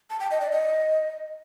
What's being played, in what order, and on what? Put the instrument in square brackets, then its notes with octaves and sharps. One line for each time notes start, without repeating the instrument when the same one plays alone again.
[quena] A5
G5
D#5
D5
D#5